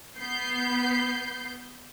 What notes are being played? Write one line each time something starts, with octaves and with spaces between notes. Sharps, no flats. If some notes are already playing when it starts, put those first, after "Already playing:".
B3 G6 C7